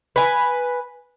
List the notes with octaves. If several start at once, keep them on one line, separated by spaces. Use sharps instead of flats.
B4 G#5